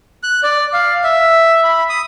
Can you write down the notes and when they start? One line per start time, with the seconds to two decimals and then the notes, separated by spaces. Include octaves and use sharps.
0.23 F#6
0.43 D5
0.73 F5
1.04 E5
1.64 B5
1.89 D#6